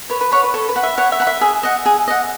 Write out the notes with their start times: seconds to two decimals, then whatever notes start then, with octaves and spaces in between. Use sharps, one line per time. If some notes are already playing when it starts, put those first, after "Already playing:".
0.10 B4 C#5
0.21 B4
0.31 C#5 F#5 B5
0.43 B4
0.54 A4 C#5
0.69 B4
0.76 F#5 B5
0.83 E5
0.98 C#5 F#5
1.12 E5
1.20 F#5 B5
1.27 E5
1.41 G#4 E5
1.63 D#5 F#5
1.86 G#4
2.08 D#5 F#5